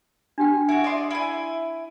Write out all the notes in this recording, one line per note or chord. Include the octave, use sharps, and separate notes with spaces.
D4 G4 G5
E4 F#4
D5 D#5 C6
E4 G#5